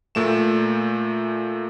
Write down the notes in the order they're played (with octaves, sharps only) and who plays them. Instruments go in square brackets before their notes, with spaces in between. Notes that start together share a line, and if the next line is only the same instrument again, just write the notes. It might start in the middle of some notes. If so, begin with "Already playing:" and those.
[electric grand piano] A#2 A3 E7